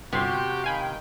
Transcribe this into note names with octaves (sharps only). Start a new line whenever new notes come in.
G1 C3 F#4 G4 C6
D#3 F5 G5 G#5 B5